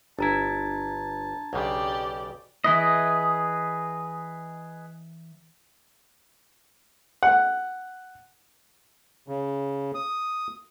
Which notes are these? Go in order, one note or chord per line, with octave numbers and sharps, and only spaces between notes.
G1 D4 E4 A5 A#5 G#6
B1 C#3 G4 D5
E3 E4 G#4 B4 D#5
F#5
C#3
D#6